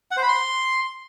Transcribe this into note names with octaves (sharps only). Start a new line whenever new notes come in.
F#5
C5
B5
C6